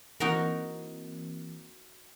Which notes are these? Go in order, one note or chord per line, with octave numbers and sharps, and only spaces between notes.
E3 A#3 C4 D#4 F#4 A#4